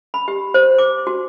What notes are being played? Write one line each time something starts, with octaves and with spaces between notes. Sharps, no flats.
B5
G4
C5
D6
F#4